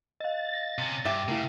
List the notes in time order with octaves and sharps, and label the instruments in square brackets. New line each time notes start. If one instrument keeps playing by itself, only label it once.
[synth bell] D#5 F5 [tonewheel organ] A6
[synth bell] A#6
[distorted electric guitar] C3 C#4
[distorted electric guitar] G2 [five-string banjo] G4 E5
[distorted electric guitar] C#3 [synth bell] A3 E4